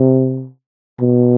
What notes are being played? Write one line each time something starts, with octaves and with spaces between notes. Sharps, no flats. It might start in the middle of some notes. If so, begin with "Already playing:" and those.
Already playing: C3
B2